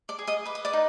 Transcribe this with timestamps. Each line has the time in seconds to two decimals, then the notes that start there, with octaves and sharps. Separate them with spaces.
0.09 D5 D6
0.19 G#4
0.27 D#5 D#6
0.46 B4 D6
0.55 D#6
0.65 D5 D6
0.73 D#4